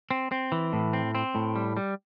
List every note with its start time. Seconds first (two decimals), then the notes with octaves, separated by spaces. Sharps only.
0.11 C4
0.32 C4
0.52 E3
0.73 A2
0.93 C4
1.15 C4
1.35 A2
1.56 G3
1.77 G3